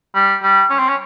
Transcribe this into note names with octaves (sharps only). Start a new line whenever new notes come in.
G3
G3
C#4
C4
C#4